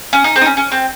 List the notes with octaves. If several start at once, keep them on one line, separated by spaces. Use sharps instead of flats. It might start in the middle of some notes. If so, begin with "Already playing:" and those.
C#4
D#4
C4
D#4
C#4
C#4
C4